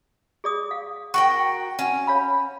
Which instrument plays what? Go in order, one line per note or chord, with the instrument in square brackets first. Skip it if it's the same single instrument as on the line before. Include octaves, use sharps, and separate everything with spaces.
[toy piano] G#4 D5 D#6
F5
[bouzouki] F#4 A#4 G5 [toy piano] C#6
[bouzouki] C#4 [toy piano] F#5
[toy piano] C#5 F5 B5